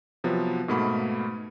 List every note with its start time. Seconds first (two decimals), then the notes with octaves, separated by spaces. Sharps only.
0.24 C3 F3 F#3 B3
0.68 G#2 B2 A3 A#3 B5